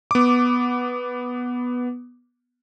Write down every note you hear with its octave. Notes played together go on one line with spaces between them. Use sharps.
B3 D6